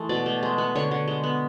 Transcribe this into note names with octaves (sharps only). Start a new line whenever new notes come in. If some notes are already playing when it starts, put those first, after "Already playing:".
Already playing: E3 G#3 A3
B2 D5
A3
G#3
B3
D3 C#5
D3
G#3
B3